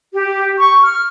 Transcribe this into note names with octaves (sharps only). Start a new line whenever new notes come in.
G4
C#6
F6